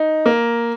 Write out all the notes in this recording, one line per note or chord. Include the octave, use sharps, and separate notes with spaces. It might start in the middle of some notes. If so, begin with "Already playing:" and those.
Already playing: D#4
A#3